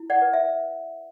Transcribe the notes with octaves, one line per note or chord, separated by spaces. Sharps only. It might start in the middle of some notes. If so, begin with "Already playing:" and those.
Already playing: E4
D5 F#5
B4
E5